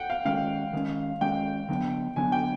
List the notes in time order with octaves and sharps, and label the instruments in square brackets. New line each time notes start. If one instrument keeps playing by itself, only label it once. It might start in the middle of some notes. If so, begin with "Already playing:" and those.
Already playing: [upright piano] F#5 G5
F5
[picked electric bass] D#3 G#3 C#4 [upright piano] F5
[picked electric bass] D#3 G#3 C#4
[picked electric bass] D#3 G#3 C#4 [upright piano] G5
[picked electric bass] D3 F#3 B3 D4
[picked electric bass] D3 F#3 B3 D4 [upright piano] G#5
[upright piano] G5